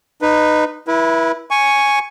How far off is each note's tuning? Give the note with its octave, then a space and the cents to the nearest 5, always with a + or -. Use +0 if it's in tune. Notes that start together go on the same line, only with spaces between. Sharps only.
D#4 -20 B4 +0
E4 +0 B4 -35
G#5 +0 C#6 +0